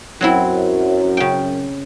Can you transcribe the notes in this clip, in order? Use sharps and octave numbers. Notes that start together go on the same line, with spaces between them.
F#2 F#3 C4 E4
C#3 G5